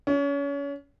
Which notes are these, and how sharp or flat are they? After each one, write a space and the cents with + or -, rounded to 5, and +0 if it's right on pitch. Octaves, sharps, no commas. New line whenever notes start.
C#4 +30